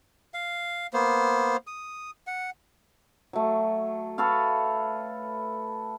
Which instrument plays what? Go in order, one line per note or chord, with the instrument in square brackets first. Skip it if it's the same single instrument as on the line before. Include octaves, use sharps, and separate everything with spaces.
[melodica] F5
A#3 B3 C5
D#6
F#5
[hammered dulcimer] F#3 A3
A4 B4 C#5 F5